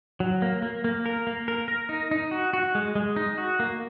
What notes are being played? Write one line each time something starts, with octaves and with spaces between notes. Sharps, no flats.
F#3
A#3
A#3
A#3
A#4
A#3
A#4
A#4
D#4
D#4
F#4
F#4
G#3
G#3
D#4
F#4
A#3